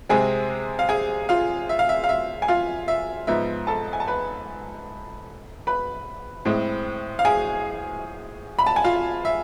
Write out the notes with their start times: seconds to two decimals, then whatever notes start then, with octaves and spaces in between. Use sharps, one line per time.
0.09 C3 G#3 C4 G#4 G#5
0.79 F5
0.89 G#4 G#5
1.29 F4 F5
1.69 E5
1.79 F5
1.89 E5
2.04 F5
2.09 E5
2.42 G#5
2.48 F4 F5
2.88 E5
3.27 G#2 F3 B3 E5
3.67 A4 A5
3.93 G#5
4.00 A5
4.08 B4 B5
5.67 B4 B5
6.45 A2 G#3 C4
7.19 F5
7.25 G#4 G#5
8.59 B5
8.67 A5
8.76 G#5
8.84 F4 F5
9.25 E5